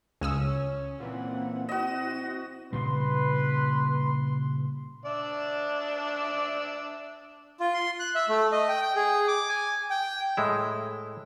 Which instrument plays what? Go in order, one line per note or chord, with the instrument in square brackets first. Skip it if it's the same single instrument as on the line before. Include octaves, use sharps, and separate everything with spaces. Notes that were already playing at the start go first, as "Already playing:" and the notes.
[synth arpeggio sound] C#2 D#6 E6 [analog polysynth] C#4
[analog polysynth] A#2 E3 [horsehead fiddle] C4 F#5
[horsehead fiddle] C4 E4 [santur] F#4 D#5 [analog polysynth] E7
[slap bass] A#2 C#3 G3 [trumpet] B4 [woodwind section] C6
[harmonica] D4 D5 E5
[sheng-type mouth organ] F4
C6
F#6
E5
A3
D#5
G5
G5
G#4
D6
G#5
G5
[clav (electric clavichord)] A2 G#3 E4